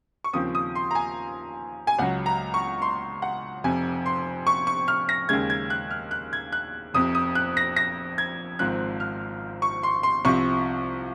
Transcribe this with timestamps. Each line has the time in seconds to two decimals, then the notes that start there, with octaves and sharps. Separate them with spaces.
0.24 C#6
0.33 D#2 C#3 F3 C4 D#6
0.55 D#6
0.75 C6
0.91 A#5
0.95 G#5
1.87 G#5
1.99 C#2 C#3 F#3 F#5
2.26 A#5
2.54 C#6
2.82 C6
3.22 F#5
3.64 F1 F2 C3 G#5
4.06 C6
4.47 C#6
4.67 C#6
4.88 F6
5.09 A#6
5.29 D#2 C#3 G#3 G#6
5.50 G#6
5.70 F#6
5.90 F6
6.11 F#6
6.33 G#6
6.52 F#6
6.94 F1 F2 C3 D#6
7.15 D#6
7.35 F#6
7.57 A#6
7.76 A#6
8.18 G#6
8.59 G#1 G#2 F3 C4 F#6
9.00 F6
9.62 C#6
9.83 C6
10.03 C6
10.25 C2 C3 F3 C4 C#6